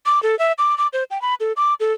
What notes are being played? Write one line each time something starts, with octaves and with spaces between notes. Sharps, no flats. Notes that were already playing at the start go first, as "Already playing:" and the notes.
D6
A4
E5
D6
D6
C5
G5
B5
A4
D6
A4